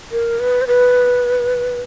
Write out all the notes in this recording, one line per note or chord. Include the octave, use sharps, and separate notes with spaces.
A#4
B4
C5
B4